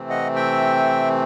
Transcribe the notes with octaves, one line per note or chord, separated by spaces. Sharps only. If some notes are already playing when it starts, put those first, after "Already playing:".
Already playing: C3 E3 A3 C4
D#5 F#5
E5 G5